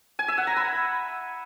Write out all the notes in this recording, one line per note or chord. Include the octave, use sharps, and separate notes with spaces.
G#5
E5
F#5
A#5
B5